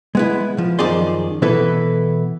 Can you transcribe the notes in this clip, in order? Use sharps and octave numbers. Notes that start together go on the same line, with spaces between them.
G#3 B3 E4
F3
F#2 D#3 F3 G#4 D5 C6
B2 E3 B3 E4 A4 B4